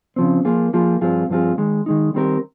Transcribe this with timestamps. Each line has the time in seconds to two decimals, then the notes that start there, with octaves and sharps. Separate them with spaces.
0.16 C#3 F3 C4
0.45 F3 A#3 F4 G#4
0.73 F3 A#3 F4 G#4
1.01 G2 F3 C4 F4 G#4
1.29 G2 F3 C4 F4 G#4
1.58 D#3 G#3 D#4
1.86 D#3 G#3 D#4
2.14 D#3 G3 C4 G4 A#4